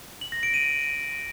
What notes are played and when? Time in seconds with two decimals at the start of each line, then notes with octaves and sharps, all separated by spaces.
0.21 F#7
0.32 A#6
0.43 D7
0.54 D#7